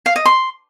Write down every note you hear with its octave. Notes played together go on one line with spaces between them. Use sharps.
F5
D#5
C6